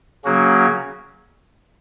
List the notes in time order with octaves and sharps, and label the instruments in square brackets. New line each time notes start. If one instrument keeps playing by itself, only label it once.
[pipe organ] C#3 F#3 A#3 C#4 F#4